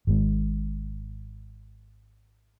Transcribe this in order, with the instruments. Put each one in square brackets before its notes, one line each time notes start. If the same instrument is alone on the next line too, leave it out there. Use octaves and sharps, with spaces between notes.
[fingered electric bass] G#1 G#2